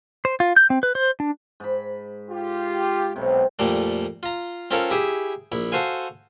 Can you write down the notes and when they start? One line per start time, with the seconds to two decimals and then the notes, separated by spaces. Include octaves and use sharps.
0.25 C5
0.40 F4
0.56 G6
0.70 C4
0.83 B4
0.95 C5
1.20 D4
1.60 G#2 B5
2.30 F4 G4
3.16 B1 C3
3.59 F2 A#2 G3 A3
4.23 F4 A#5
4.71 C4 C#4 F4 A4 A#4 C#5
4.90 E4 G4 G#4 E5
5.52 A#1 E4
5.72 F#4 A4 C5 F5 G#5